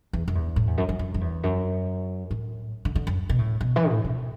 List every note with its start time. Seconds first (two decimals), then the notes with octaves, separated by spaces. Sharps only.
0.13 E2
0.28 F#2
0.35 E2
0.56 A2
0.67 E2
0.78 F#2
0.89 F#2
0.99 F#2
1.14 F#2
1.21 E2
1.43 F#2
2.31 A2
2.85 D3
2.95 D3
3.07 F#2
3.29 B2
3.39 A2
3.61 B2
3.76 E3
3.90 A2
4.04 B2